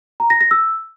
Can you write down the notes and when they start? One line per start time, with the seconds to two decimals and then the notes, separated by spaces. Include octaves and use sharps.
0.20 A#5
0.30 A#6
0.41 A#6
0.51 E6